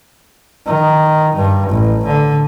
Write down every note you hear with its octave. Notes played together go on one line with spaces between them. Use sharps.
D#3
G2
A1
D3